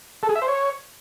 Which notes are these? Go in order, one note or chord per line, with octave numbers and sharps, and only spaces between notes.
A4
G#4
E5
C5
C#5